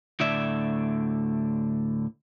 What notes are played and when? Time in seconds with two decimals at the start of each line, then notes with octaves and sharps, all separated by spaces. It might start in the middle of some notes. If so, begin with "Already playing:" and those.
0.20 D2 A2 D3 D5 E5